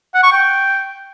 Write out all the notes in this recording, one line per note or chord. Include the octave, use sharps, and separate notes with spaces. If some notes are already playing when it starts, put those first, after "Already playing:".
F#5
C#6
G5